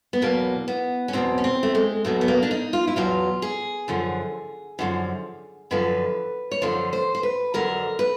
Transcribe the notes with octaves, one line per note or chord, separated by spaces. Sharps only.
B3
E2 B2 F#3 A#3
B3
C#4
E2 B2 F#3 C4
C#4
C4
A3
G#3
E2 B2 F#3 A3
B3
A#3
D4
D#4
F4
E4
E2 B2 F#3 F4
G#4
F#2 D3 F3
F#2 D3 F3
F#2 D3 F3 B4
C#5
F#2 D3 F3 C5
C5
C5
B4
F2 D3 F#3 A#4
B4